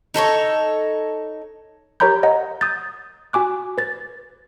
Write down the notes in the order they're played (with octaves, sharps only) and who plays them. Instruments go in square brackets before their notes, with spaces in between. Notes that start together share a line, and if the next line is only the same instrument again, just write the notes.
[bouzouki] D#4 A4 B4 C#5
[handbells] G4 A#4 C#5 A#5 B5 G6
C#5 D#5 F#5 A#5
D#6 G6 A6
F#4 G#5 D6 F#6
B4 A6